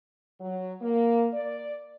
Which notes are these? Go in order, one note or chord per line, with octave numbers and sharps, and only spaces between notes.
F#3
A#3
D5